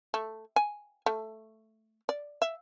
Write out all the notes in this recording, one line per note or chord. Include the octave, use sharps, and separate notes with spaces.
A3
G#5
A3
D5
E5